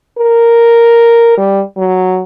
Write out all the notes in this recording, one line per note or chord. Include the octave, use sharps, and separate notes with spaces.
A#4
G3
F#3